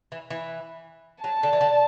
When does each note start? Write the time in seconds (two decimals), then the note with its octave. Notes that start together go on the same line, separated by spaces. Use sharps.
0.12 E3
0.30 E3
1.24 F#3 A5
1.43 D3
1.53 E3
1.61 D3